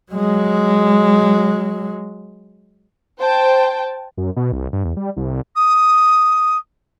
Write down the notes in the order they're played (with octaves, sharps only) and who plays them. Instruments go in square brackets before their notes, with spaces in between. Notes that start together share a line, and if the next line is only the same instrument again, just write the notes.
[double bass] F#3 G#3
[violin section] C5 G5 A5
[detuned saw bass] F#2
B2
C2
G2
E2
G3
C2
[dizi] D#6